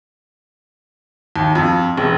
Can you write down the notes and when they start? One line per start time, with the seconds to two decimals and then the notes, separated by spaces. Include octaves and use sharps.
1.36 D#2
1.55 F2
1.98 E1